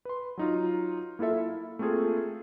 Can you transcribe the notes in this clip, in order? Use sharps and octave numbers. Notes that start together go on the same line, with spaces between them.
B4 C6
F#3 D#4 F4
A#3 E4 F4 A4 E5
E4
A3 A#3 C4 F4 G#4 A4